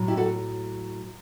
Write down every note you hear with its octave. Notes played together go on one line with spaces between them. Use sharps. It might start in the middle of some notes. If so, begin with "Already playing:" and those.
Already playing: A2 F#3
E4 G4
F#4 A4